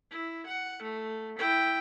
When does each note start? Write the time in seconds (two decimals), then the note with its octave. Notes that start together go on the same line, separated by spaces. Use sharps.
0.11 E4
0.46 F#5
0.82 A3
1.38 E4 G5